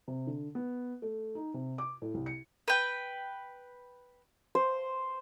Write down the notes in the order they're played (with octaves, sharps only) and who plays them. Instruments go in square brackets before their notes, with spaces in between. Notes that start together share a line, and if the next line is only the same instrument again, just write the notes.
[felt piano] C3
D3
B3
A3
D#4
C3
D6
A2
C2
C#7
[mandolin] B4 G5
[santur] C5